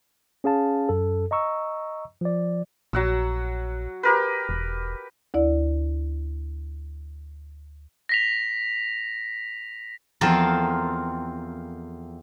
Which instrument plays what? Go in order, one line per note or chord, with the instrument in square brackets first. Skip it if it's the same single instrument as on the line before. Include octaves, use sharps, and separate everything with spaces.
[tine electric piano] C#4 G#4 F5 A5
F#2 A4
D#5 A#5 C#6 E6
F3 D5
[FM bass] A#1 [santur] F#3 F#5 E6
[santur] G4 A#4 B4
[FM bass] E1
[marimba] D2 E4 D5
[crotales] A#6 B6 F7
[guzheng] E2 F3 C4 F4 A4 A#4